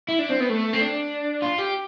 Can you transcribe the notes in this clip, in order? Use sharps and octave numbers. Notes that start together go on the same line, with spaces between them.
E4
D4
C4
B3
A3
C4
D4
F4
G4